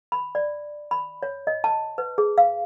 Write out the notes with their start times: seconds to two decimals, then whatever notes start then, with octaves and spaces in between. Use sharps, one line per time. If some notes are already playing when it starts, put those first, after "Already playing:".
0.12 B5
0.35 D5
0.91 B5
1.23 C#5
1.47 D#5
1.64 A5
1.98 B4
2.18 G#4
2.38 F5